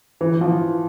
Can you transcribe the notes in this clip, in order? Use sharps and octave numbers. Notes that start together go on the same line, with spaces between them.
E3
F3